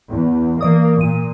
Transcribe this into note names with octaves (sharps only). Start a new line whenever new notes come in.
E2
E3 A#3 D5 D#6
A#2 D#7